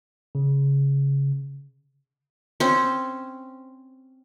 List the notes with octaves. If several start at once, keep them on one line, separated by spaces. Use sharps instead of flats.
C#3
C4 C#4 C5